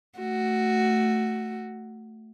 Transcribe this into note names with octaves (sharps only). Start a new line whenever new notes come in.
A3 F#4